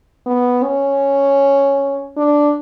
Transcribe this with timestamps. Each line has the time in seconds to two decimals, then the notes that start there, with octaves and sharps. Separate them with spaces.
0.26 B3
0.63 C#4
2.17 D4